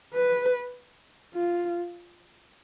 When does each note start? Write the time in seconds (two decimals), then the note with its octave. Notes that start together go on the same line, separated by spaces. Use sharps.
0.14 B4
1.34 F4